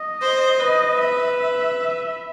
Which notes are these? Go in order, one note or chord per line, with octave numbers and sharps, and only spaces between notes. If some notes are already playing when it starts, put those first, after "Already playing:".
Already playing: D#5
C5
B4 D#5
E5